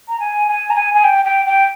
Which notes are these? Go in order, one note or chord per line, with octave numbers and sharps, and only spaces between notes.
A#5
G#5
G#5
A#5
G#5
G#5
G5
G5
G5